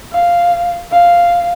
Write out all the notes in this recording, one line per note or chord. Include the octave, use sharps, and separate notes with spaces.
F5
F5